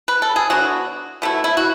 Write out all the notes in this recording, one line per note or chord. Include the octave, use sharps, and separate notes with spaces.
B4
A4
G#4
D3 F#3 B3 F#4
B2 A3 E4
E4
F#4